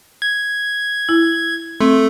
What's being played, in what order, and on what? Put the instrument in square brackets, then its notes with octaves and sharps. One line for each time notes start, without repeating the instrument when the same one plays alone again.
[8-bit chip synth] G#6
[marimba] E4
[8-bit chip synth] A3 [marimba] C4